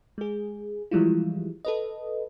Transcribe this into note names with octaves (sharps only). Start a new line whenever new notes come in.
G#3 G#4
E3 F3 G3 G#3 E4 F4
A4 B4 D#5